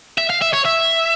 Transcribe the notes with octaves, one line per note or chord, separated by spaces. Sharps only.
E5
F5
E5
C#5
E5